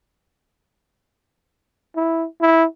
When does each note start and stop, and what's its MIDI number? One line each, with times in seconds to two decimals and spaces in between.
1.96 2.25 64
2.41 2.65 64